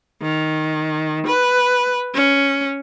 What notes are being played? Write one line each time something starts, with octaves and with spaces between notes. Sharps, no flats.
D#3
B4
C#4